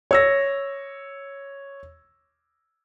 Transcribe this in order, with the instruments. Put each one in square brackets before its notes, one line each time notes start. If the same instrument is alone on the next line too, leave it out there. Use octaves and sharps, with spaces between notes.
[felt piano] C#5 E6 A#6